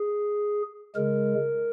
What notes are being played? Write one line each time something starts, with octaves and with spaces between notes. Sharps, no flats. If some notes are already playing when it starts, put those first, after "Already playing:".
Already playing: G#4
C#3 G#3 A#4